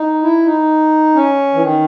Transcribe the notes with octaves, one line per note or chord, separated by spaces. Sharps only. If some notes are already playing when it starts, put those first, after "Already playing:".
Already playing: D#4
E4
D#4
C#4
E3
D#3